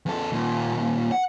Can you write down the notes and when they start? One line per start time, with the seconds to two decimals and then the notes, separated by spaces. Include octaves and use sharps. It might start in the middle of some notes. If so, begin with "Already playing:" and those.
0.06 E2 A4
0.32 D#2 A#2
1.12 F#5